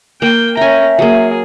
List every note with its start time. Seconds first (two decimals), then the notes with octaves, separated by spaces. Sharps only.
0.22 A#3 G5
0.57 C#4 E5 G5 G#5 A#5
0.99 F#3 A#3 G#4